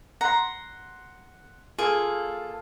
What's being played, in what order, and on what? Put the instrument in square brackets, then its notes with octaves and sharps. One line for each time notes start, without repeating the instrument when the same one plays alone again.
[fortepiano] F#5 C6 [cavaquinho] A#5
[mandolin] A#3 A4 [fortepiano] F4 [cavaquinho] G#4